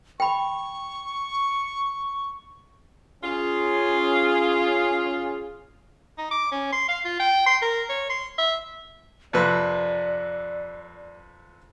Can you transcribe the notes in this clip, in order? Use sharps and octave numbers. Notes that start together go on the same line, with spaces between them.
G5 B5 C#6
C#4 F4 G#4
D#4
D6
C#4
C6
F5
F4
G5
C6
A#4
C#5
C6
E5
F2 C3 B4 D5